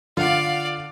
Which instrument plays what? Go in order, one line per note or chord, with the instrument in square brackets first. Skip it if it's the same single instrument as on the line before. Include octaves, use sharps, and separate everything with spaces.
[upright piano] D3 [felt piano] F4 F#5 [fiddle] D5 F5